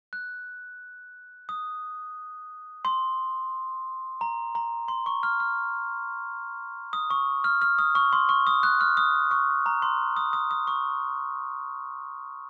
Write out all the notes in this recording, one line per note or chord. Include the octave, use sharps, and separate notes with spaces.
F#6
D#6
C6
A#5
A#5
C6
C#6
F6
F6
D#6
C#6
F6
F6
D#6
C#6
C6
C#6
D#6
F#6
F6
D#6
C#6
A#5
C6
D#6
D#6
D#6
C#6